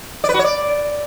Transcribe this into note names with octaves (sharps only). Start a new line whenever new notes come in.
D5
B4
F#4
C#5
D5